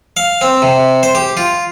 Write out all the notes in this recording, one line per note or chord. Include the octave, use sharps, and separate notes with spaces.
F5
C4
C3
C5
G4
F4